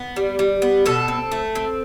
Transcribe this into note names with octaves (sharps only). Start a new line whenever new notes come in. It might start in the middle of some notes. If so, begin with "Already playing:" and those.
Already playing: B3
G3
G3
B3
B2 A4
C4
A3
C4